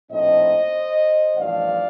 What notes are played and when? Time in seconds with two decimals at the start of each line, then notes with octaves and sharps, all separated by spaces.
0.11 A#1 A2 F3 C4 D#4 C5 D#5
1.37 A1 G2 F3 D5 F5